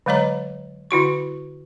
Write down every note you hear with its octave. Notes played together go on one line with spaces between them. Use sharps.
D3 F#3 G#3 C#5 D#5 A#5
D3 E4 F#4 C#6